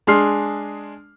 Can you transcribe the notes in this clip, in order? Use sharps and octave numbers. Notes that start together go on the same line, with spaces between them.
G#3 D4 G#4 C6 F6 C7